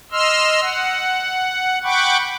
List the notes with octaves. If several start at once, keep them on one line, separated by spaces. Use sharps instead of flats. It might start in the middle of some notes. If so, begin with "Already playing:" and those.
D#5 C6 E6 F6
F#5
F#5 G5 B5 C#6 D6